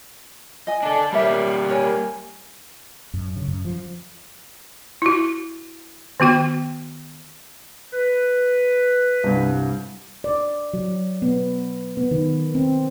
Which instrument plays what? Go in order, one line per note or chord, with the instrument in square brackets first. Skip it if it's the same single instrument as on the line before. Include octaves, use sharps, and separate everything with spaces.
[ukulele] D#5 G#5
[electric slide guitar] D4 A4
[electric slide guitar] G3 A#3 [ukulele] A#4 C#5 E5
[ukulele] A#4 C#5 G#5
[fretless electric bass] F#2
C#3
F#2
F3
[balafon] E4 F#4
D#3 B3 F#4 G5
[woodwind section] B4
[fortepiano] C2 G2
[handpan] D5
F#3
B3
B3
D#3
C4